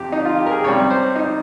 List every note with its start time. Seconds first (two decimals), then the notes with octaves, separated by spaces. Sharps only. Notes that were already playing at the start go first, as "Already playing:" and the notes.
Already playing: F2 C3 F3 G4
0.12 D#4
0.25 F4
0.39 G4
0.46 A#4
0.51 G#4
0.64 C#2 C3 G3 C#5
0.90 C5
1.16 D#4